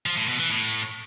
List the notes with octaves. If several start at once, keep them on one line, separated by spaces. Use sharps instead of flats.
F3
A2
B2
E3
A2